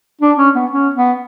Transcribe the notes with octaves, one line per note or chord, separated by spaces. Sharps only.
D4
C#4
B3
C#4
B3